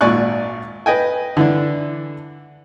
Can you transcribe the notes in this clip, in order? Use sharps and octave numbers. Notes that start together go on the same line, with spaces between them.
G#1 A#2 D5 G#5 C#6 F#6
B4 D#5 G5 G#5
D3 E3 D4